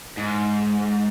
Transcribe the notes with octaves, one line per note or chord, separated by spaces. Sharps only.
G#2